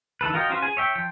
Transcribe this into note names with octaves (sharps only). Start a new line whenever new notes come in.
D#3 E3 A4 B4
F4 F#4 A#4 D#5 G5
C#4 F4 F#4 B4 C5
G#4 G#5
C#5 E5 G5
F3 G5